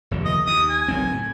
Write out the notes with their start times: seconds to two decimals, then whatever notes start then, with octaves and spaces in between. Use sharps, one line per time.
0.11 F1 D#2 D3
0.25 D#5
0.47 D#2 D#6
0.70 G#5
0.88 F#1 B1 C4
1.12 A2